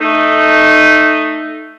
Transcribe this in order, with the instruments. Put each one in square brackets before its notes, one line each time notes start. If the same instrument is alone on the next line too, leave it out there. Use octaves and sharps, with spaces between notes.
[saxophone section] A3 D#4